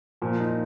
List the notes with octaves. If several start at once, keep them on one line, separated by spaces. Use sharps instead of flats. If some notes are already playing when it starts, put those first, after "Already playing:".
A#2 F3
D#4